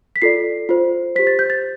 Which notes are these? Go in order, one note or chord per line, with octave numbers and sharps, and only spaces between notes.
B6
F4 A4 D5 C7
F4 C5
G4 C5 B6
A6
G6
A6